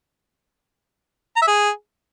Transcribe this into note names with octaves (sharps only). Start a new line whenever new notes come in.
A#5
E5
G#4